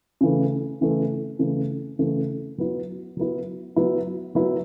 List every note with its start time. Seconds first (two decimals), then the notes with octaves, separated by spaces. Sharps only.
0.21 C#3 E3 A3
0.81 C#3 E3 A3
1.39 C#3 E3 A3
1.99 C#3 E3 A3
2.58 F#3 B3 E4
3.17 F#3 B3 E4
3.76 F#3 B3 E4
4.35 F#3 B3 E4